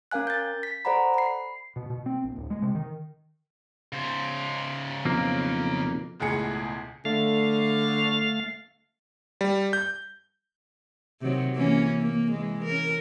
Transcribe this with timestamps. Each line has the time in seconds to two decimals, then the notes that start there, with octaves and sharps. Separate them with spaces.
0.11 C#4 A#4 F5 G#5 F#6
0.27 G6 A6
0.63 B6
0.85 A4 C5 D5 F#5 A#5 B5
1.14 B5 C7
1.76 B2
1.90 B2
2.06 C4
2.24 A#1
2.36 D1
2.50 G#3
2.62 C3
2.75 D#3
3.93 C#3 C5
5.05 B1 F2 A#3
6.20 E1 C#2 A2 G#4 C#7
7.05 D3 A3 F5
9.41 G3
9.73 G6
11.21 C3 D#3 F#3
11.55 E3 A#3 C#4
12.02 A#3
12.31 E3 G#3
12.64 C#4 A#4